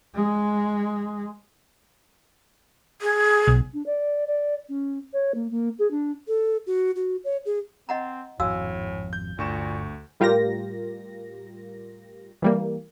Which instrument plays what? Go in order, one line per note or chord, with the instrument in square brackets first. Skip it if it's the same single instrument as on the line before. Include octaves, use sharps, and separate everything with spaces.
[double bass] G#3
[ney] G#4
[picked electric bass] B1
[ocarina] D4
D5
D5
C#4
C#5
A#3
A#3
G#4
D4
A4
F#4
F#4
C#5
G#4
[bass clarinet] C4 [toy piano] D#5 F#5 A#5
[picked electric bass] G#1 F2 [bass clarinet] A2 [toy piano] F#4 F5 E6 [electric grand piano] G#5
[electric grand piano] G6
[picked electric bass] G1 [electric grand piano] D2 C#6 E7 [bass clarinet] A#2
[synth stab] A2 G3 F4 G4 A#4 A#6
E3 G3 A#3